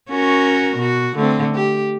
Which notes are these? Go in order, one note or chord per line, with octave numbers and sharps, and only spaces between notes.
C#4 F#4 A#4
B2 F#4
D3 A3 C4
G4